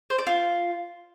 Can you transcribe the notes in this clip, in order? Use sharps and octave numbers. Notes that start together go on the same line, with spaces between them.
C5
D5
F4